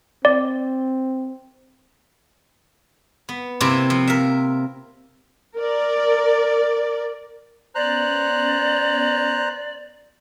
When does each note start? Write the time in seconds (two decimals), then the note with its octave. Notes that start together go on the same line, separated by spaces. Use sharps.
0.25 C4 D5
3.29 B3
3.60 C3 A#3 C4 E4
3.90 F3
4.08 A#4 E5
5.57 A#4 D5
7.75 B3 C#4 C5 D5 A#5 F#6